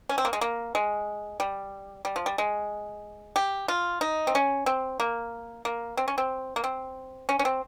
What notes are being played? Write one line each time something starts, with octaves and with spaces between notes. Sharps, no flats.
C#4
C4
A#3
G#3
A#3
G#3
G3
G3
F3
G3
G#3
G4
F4
D#4
C4
C#4
C4
A#3
A#3
C4
C#4
C4
A#3
C4
C#4
C#4
C4